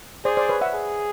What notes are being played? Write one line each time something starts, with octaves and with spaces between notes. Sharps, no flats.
G#4 C5 D5
C5 D5
B4 C#5
E5 F#5
G#4